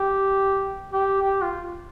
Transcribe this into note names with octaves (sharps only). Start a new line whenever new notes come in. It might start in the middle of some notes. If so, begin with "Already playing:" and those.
Already playing: G4
G4
G4
F4